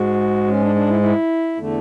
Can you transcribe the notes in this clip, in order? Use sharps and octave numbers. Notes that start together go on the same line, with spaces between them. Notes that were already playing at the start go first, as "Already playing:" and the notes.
Already playing: G#2 G#3 F#4
C#4
D4
D4
E4
E4
E2 D3 A3